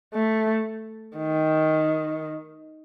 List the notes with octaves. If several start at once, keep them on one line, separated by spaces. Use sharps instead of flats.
A3
D#3